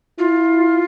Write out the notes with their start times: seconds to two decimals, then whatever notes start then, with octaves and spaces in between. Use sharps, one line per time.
0.19 E4 F4